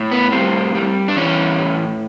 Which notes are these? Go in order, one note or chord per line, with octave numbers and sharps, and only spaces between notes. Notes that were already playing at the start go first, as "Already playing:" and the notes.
Already playing: A2
B3
G3 C4
G3
D4
E3 C#4
A2